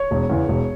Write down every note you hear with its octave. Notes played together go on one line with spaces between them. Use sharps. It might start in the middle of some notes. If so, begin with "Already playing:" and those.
Already playing: C#5
E1
E2 C#3
E1